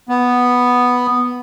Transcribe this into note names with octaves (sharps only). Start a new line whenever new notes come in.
B3